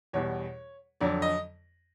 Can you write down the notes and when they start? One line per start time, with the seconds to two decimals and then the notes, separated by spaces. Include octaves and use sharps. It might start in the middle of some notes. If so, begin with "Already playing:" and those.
0.13 E2 B2 G3 C#5
1.01 F2 D3 F#3 D5
1.22 D#5